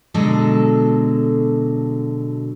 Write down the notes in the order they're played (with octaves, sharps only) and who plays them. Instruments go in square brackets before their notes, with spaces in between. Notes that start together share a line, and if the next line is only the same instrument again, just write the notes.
[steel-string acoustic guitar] B2 D3 F#3 G#3 A4